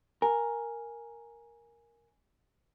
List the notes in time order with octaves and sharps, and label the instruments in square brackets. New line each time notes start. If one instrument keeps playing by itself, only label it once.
[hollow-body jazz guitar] A#4 [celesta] G#5